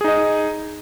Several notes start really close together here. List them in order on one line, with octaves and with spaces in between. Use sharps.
G#4 D#4 D#5